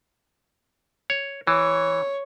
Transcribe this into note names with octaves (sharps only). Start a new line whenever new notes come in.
C#5
E3 C#5